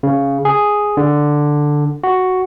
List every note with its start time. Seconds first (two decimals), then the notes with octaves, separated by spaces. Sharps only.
0.03 C#3
0.45 G#4
0.97 D3
2.04 F#4